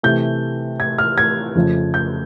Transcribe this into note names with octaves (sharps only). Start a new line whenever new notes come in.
C3 E3 A3 G6
G#6
F6
G#6
F2 C#3 F3 A3
G6